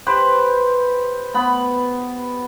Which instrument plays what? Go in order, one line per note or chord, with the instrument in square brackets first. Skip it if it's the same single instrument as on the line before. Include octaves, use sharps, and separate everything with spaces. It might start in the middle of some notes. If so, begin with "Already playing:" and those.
[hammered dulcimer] G4 B4 C5
B3 B5